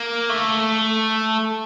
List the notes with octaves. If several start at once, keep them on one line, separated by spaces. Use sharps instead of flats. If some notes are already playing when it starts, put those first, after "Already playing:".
Already playing: A#3
A3